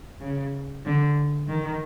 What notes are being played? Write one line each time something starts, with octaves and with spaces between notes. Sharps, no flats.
C#3
D3
D#3